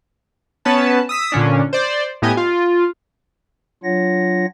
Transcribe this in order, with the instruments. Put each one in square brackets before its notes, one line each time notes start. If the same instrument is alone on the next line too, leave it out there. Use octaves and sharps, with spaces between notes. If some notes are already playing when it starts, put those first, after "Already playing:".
[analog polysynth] B3 C#4 B4 A5
D#6 E6 B6
A#2 D3 C#4 D4
C5 D5
A2 B3 G4 D#5 G#5
F4
[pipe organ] F#3 D4 F4 C#5 F#5 A#6